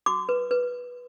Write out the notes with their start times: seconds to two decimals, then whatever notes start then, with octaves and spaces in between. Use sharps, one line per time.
0.06 F#4 D6
0.29 B4
0.51 B4